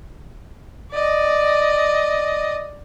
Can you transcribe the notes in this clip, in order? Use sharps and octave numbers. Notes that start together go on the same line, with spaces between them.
D5 D#5